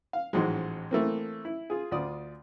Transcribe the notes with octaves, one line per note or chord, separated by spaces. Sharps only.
F5
A1 G#2 F3 F#3 G#3
E3 A3 A#3 C4
E4
F4 G#4
D2 F4 D5 D#6